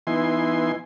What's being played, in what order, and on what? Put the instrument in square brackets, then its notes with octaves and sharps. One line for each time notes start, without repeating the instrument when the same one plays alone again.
[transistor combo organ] E3 B3 D#4 E4 G#5 C6